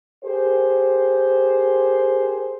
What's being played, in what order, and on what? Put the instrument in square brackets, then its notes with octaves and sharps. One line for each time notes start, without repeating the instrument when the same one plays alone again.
[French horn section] G4 G#4 A#4 C5